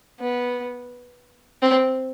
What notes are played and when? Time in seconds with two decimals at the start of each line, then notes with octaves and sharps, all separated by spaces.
0.20 B3
1.62 C4